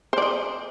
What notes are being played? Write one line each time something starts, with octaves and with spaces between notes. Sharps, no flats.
C5 D5 D#5